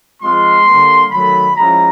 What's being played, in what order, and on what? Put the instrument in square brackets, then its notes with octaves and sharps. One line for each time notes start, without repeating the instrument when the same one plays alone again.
[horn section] F3 G#3 C4 F4 C6
D3 G3 A#3
D#3 F#3 A3 B5
F3 G#3 C#4 E4 A#5